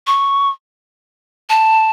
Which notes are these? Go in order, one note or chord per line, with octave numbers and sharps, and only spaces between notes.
C#6
A5